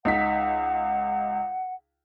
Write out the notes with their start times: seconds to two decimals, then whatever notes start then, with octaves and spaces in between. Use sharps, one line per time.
0.05 C#2 D#4 F#5 B6